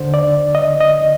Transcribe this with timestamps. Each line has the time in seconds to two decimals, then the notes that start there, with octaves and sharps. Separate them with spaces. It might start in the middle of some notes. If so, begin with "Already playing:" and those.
Already playing: D#2 D3 C5
0.14 D5
0.55 D#5
0.81 D#5